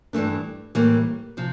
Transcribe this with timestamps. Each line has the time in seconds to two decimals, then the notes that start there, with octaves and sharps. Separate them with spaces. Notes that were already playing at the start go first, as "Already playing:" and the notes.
0.13 G2 E3 A3 D4
0.75 A2 E3 G3 A#3
1.37 C3 F3